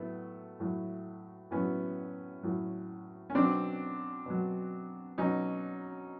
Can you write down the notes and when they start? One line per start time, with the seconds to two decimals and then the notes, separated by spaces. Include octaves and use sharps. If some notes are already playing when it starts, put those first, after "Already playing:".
Already playing: A2 F#3 A3 B3
0.60 A2 F#3
1.51 A2 F#3 B3 C#4
2.43 A2 F#3
3.30 C#4
3.35 B2 F#3 C4 D4
4.26 B2 F#3
5.18 B2 F#3 C#4 D#4